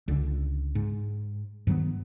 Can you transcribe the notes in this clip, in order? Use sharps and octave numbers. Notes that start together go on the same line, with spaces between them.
C#2 D3
G#2
G2 D#3 F#3 B3